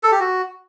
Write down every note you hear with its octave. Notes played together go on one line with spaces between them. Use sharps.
A4
G4
F#4